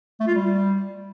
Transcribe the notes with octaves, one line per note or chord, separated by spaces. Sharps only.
A3
F4
G3